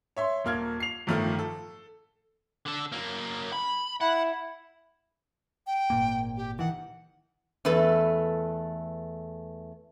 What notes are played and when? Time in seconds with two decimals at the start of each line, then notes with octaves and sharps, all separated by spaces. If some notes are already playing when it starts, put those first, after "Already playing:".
0.17 C#5 E5 C6
0.44 D#1 A#3 F6 G#6
0.80 C7 F7
1.07 G1 A2 D#3 F3 A3 F6
1.39 A4
2.66 D3 A4
2.92 F#2 A#3
3.53 B5
4.01 E4 F#5
5.67 G5
5.90 G#1 A#2 A#3
6.37 G4
6.59 D#3 E3 F#5
7.65 E2 A3 A4 B4